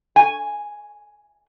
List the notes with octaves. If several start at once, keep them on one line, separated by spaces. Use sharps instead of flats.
G#5